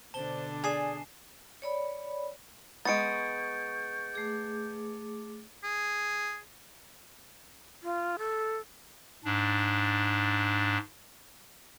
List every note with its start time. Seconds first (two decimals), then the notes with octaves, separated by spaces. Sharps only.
0.14 B2 D3 D4 C5 A5 G7
0.64 G#4 D5 G#5 C7 E7
1.62 C#5 D5 B5
2.85 G#3 B3 C#6 G6 A6 C#7 D7
4.13 A3 G#4 D6
5.63 G#4
7.83 F4
8.19 A4
9.25 G#2 D4